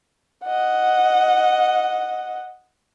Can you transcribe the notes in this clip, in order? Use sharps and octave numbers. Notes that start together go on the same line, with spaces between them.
D#5 F#5